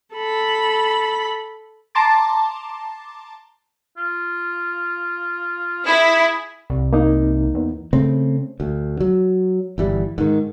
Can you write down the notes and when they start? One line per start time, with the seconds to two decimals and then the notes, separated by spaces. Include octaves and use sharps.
0.15 A4 B5
1.95 A5 A#5 C6 D6 A6
3.98 F4
5.86 E4 G#4
6.70 C2
6.93 A#3 D#4
7.54 E2
7.93 C#3 A3 C4
8.60 D2
9.00 F#3
9.78 G1 E3 G3
10.18 G#2 D#3